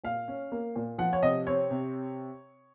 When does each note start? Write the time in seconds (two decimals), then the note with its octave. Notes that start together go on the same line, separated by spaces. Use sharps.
0.04 A#2 F5
0.28 C#4
0.52 A#3
0.76 A#2
0.98 F3 F#5
1.13 C#5
1.22 C3 D#5
1.47 C4 C#5
1.71 C3